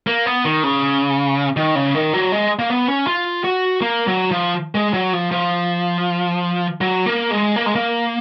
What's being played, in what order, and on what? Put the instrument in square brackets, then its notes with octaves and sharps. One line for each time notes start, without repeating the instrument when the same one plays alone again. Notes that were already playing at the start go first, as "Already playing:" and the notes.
[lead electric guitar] A#3
B3
D#3
C#3
D#3
C#3
D#3
F#3
G#3
A#3
B3
C#4
F4
F#4
A#3
F#3
F3
G#3
F#3
F3
F3
F#3
A#3
G#3
A#3
G#3
A#3